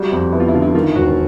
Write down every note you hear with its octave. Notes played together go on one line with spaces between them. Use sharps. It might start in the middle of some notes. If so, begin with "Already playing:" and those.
Already playing: G3 F#4
F2
B3 E4
F4
E4
D3 F4
E4
D#3 F4
E1 F#4